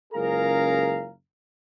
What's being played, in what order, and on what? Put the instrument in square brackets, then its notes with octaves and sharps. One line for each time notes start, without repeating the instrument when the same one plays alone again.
[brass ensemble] F#1 C#2 G#4 A#4 F5 A#5